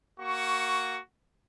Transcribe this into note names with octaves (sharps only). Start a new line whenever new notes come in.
A#3 F#4 C#6